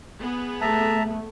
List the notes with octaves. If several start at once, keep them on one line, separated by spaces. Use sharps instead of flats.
B3 G#4
A3 E5 A5 A#5